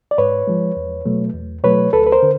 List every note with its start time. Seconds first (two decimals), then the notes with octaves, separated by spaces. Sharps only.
0.11 D5
0.18 G#2 B4 C#5
0.47 F3 G#3
0.77 E2
1.06 B2 F#3 A3
1.34 E2
1.63 B2 F#3 A3 B4 C#5
1.93 D2 A4 B4
2.06 B4
2.12 A#4 C5
2.23 D3